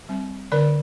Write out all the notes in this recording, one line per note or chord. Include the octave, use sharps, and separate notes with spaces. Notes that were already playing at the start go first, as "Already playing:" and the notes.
G3 C4
D3 A#4 D5